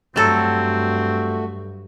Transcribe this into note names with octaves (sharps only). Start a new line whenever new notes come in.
G2 F#3 A3 C4 F#4 A4